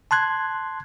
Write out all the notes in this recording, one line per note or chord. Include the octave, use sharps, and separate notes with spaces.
A5 C6 F#6 G#6